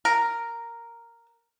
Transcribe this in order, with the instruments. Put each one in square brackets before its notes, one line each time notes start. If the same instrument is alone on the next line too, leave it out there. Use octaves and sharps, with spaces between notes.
[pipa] A#4